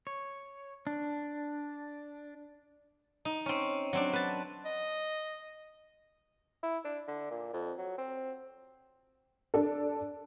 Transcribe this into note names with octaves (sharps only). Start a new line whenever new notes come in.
C#5
D4
D#4
C4 C#4
F#3 C4 D4
B4 A5
D#5
E4
D4
D3
A#2
F2
F#3
C4
D4 A4